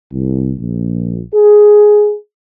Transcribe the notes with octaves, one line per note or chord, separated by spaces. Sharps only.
C2
A#1
G#4